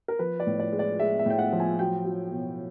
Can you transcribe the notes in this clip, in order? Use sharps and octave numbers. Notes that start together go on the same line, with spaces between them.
A#4
F3 B4
D5
A2
D5
G#3
D5
G#3 E5
E5
A2 G5
F#5
F3
G#5
F#3 G5
F#3
B2